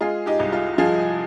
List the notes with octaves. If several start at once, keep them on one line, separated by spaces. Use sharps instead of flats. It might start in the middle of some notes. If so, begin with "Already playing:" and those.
G#3 F4 G#4
D#4 G4
C2
F4
F3 F4 G#4